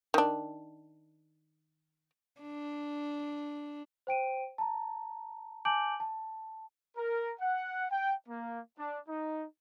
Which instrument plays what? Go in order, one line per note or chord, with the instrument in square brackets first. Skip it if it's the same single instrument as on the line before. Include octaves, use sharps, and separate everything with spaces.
[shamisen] D#3 D4
[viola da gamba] D4
[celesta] C5 G5 D7 D#7
A5 A#5
G#5 A5 D6 G6 D7 F#7
A5
[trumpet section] A#4
F#5
G5
A#3
D4
D#4